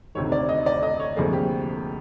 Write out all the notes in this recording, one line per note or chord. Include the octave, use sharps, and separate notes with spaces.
D2 C3 D#3 C#5
D5
D#5
D5
D#5
C#5
D2 C3 F3 A#3 G#4
G4